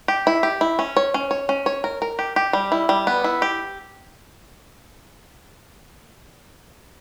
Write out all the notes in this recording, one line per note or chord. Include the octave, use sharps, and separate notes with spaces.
G4
E4
G4
E4
C#4
C#5
C#4
C#5
C#4
C#5
A#4
A#4
G4
G4
G3
E4
G3
B3
E4
G4